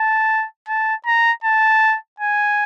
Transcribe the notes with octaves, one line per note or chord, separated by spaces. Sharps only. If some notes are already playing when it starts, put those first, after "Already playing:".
Already playing: A5
A5
A#5
A5
G#5